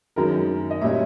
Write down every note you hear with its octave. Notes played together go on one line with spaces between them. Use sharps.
F#2 D#3 G#3 A#4
D#5
A#2 G3 A#3 C#4 E5